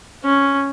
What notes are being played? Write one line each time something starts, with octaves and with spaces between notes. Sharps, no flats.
C#4